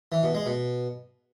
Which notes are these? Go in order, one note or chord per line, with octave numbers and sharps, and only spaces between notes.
E3
B2
G#3
B2